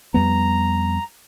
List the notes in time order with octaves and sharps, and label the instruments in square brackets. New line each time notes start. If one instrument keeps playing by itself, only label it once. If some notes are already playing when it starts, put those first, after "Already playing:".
[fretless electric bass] F2 G3 B3 [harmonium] A#5